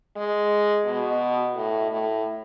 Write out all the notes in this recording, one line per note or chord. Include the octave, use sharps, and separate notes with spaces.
G#3
B2
A2
A2